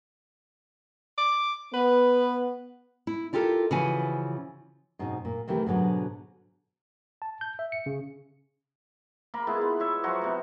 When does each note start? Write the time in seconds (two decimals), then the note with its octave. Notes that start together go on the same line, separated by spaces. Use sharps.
1.18 D6
1.74 B3 B4
3.07 E4
3.33 E4 F4 G4 A4 A#4
3.71 C#3 E3 F3 F#4 B4 G#5
4.99 G#2 B2 C4 C#4 D#4
5.25 A#2
5.48 C3 D#3 E3 A3 C4 G4
5.66 G#2 B2 D3 F#3 B3 C#4
7.22 A5
7.41 G6
7.59 E5
7.72 C#7
7.86 C#3
9.34 A#3 A#4 B5
9.47 G#3 B3 E4 F4
9.62 B3
9.80 E4 C#5 E5
10.03 F3 F#3 F#4 C#5
10.22 C3 B3